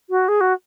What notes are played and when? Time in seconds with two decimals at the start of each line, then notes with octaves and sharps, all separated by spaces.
0.10 F#4
0.28 G#4
0.41 F#4